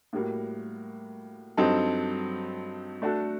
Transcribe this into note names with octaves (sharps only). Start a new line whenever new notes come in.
A2 G3 A#3 F#4
G2 F#3 C4 D#4 A4
A3 D4 F#4 A4